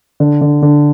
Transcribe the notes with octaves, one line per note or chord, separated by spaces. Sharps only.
D3
D3
D3